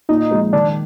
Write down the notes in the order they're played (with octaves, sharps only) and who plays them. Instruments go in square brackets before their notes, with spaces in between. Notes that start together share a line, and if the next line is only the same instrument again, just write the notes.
[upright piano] A#2 [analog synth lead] D#4
[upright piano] F3 G#3
[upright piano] D#3 [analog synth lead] D4